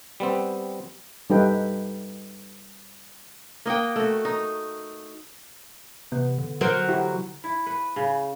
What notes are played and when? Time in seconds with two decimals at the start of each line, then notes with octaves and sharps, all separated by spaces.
0.20 G3 B3 C4
1.30 G3 D#4 A4 B4 G5
3.66 A#3 D#5 F#5 G5
3.96 A3 F#4
4.25 D#4
6.12 C3 B3
6.38 D3
6.61 F#3 A#4 C5
6.88 E4 F#4 G4
7.44 E4
7.66 B4
7.96 C#3